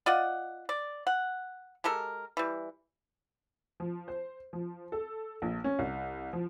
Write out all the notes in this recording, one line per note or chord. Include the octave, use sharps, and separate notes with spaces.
F4 D5 D#5 F#5
D5
F#5
G#3 G4 A4 A#4
E3 G3
F3
C5
F3
A4
A#1
C#4
C2
F3